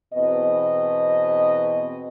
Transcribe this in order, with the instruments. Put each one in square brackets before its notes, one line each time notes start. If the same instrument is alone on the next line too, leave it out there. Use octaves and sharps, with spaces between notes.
[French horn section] E2 B2 C4 D#5